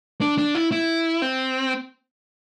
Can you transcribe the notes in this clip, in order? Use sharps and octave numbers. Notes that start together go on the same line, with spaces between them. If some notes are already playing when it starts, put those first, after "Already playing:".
D4
D4
E4
E4
C4